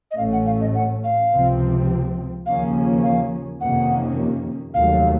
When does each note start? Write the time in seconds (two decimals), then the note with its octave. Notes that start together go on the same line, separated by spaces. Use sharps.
0.11 D#5
0.18 A1 A2 A3 C#4 F5
0.33 F#5
0.46 F5
0.61 D#5
0.75 F#5
1.04 F5
1.32 C#2 C3 F3 C4
2.46 D#2 C#3 F3 A#3 C#4 F5
3.03 F5
3.61 F2 C3 D#3 A#3 C#4 F#5
4.74 F1 D#2 D#3 F#3 A3 F5